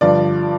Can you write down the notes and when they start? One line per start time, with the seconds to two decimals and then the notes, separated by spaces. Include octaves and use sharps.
0.01 G2 D3 F3 D5